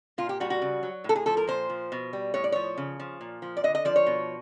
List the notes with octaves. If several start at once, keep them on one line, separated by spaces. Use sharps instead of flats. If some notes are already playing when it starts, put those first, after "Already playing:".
A#2 F4
G4
G3 F#4
F#4
C#3
F#3
A2 A4
G#4
F3 A4
A#4
A#2 C5
F3
B2
G3
A2 C#5
D5
F3 C#5
C#3
F3
A#2
F3
D5
D3 D#5
D#5
F3 D5
C#5
B2